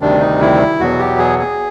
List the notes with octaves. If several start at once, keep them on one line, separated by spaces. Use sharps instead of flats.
D2 C3 D#3 G3 D4
D#4
E4
E2 B2 F#3 B3 F#4
G4
G#4
G#4